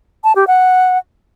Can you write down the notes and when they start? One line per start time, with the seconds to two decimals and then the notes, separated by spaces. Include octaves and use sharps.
0.24 A5
0.36 G4
0.47 F#5